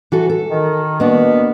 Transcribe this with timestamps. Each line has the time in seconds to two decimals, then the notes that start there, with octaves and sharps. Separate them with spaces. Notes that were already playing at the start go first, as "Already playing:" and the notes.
0.12 E3 F#4 A4
0.30 A4
0.51 D#3
1.00 B2 A#3 B3 D4